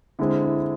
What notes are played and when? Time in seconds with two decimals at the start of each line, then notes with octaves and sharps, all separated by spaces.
0.19 D3 G#3 C4 E4
0.45 E4